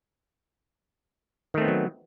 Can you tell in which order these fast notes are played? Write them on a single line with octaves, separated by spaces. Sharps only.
D#3 A3 C4 B3 F#3